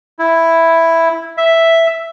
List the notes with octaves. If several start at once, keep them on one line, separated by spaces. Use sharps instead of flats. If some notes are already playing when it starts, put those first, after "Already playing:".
E4
E5